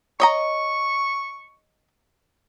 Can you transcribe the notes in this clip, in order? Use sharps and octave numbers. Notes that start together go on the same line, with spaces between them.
C#5 D#5 A#5 C#6